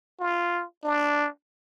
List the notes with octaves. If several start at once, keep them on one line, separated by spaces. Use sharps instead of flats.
F4
D4